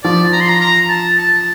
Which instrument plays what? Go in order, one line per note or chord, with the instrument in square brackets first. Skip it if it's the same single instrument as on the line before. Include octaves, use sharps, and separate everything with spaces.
[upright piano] F3 [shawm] D5
[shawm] A#5
C6
A#5
A#5
A5
A5